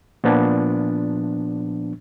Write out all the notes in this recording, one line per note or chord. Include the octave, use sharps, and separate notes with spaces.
A#2 F3 B3 D4